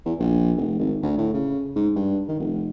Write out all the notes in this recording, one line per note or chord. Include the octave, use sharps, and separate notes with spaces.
E2
A#1
F1
G#1
D2
A2
C#3
G#2
G2
D#3
F1